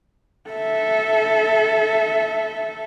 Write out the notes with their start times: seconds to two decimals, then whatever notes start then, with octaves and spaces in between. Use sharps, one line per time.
0.50 A4 E5